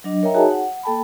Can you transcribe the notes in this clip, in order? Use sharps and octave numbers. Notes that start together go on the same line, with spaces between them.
F#3 D4 D#5
A#4 C#5 D#5 E5 G5 A#5
D#4 F#4 G#4 C#5 G#5 A5
F#5
A#3 A4 G5 A5 B5